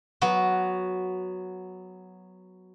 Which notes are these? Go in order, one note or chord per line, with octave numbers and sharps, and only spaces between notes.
F#3 B3 F#4